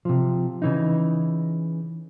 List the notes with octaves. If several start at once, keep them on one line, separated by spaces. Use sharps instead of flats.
C3 F3
C#3 E3 D#4